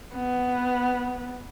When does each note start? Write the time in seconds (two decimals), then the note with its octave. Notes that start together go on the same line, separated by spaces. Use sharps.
0.14 B3